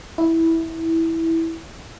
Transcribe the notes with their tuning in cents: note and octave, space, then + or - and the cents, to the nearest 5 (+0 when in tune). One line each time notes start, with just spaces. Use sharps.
E4 -10